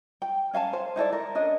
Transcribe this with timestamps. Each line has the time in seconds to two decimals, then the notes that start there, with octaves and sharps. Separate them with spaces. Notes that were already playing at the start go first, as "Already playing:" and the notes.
0.22 G5
0.53 C#4 F5 G#5 A5
0.73 C5
0.96 D#4 E4 A4 D5
1.13 A#4
1.35 C#4 D4 D#5